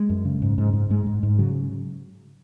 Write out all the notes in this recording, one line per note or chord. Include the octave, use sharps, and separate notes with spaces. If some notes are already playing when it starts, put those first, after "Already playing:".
Already playing: G#3
F#2
C#3
G#2
G#2
G#2
G#2 G#3
G#2
G#2
C#3 F#3